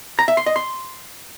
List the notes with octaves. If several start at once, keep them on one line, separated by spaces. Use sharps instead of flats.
A#5
E5
C6
D#5
C6